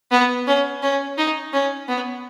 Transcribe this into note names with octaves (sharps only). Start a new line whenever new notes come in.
B3
C#4
C#4
D#4
C#4
B3